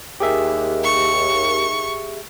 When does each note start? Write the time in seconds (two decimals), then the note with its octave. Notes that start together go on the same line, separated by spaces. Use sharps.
0.20 D#2 G4 G#4 E5
0.83 C#6